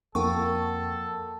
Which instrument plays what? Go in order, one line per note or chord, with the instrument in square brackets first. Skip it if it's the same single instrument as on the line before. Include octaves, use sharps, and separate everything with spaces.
[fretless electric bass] F2 [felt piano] A#3 [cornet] A4 [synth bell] F#5 G5 C#6